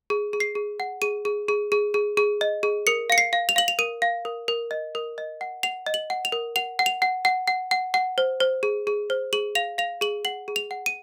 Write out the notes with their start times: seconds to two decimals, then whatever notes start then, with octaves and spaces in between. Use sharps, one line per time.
0.10 G#4
0.33 G#4
0.40 C7
0.55 G#4
0.80 F#5
1.02 G#4 D#7
1.25 G#4
1.49 G#4
1.72 G#4
1.94 G#4
2.17 G#4
2.41 D#5
2.63 G#4
2.87 A#4 C#7
3.10 F5 C#7
3.18 C7
3.33 F5
3.49 F7
3.56 F5 F#7
3.68 F7
3.79 A#4 D#7
4.02 F5
4.25 A#4
4.48 A#4
4.71 D#5
4.95 A#4
5.18 D#5
5.41 F#5
5.63 F#5 F7
5.86 D#5
5.94 F#7
6.10 F#5
6.25 F7
6.32 A#4
6.56 F#5 F7
6.79 F#5
6.86 F7
7.02 F#5
7.25 F#5
7.47 F#5
7.71 F#5
7.94 F#5
8.18 C5
8.40 C5
8.63 G#4
8.87 G#4
9.10 C5
9.33 G#4 F#7
9.55 F5 F7
9.78 F5 F7
10.01 G#4 F#7
10.25 F#5 F#7
10.48 G#4
10.56 F7
10.71 F#5
10.86 D#7